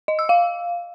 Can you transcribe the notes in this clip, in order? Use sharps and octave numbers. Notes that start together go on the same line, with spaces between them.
D#5
E6
F5